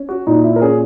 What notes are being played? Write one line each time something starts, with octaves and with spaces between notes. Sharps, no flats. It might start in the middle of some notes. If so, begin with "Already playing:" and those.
Already playing: C#4
F#4
A#2 D#4
E4
A#4
C#4 G#4